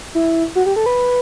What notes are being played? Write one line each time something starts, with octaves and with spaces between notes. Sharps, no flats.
E4
F#4
G4
A4
B4